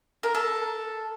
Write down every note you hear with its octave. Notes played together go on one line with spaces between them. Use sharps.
A#4
A4